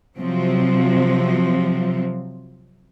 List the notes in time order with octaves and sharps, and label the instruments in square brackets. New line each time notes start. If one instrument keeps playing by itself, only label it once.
[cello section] C3 F3 F#3 C4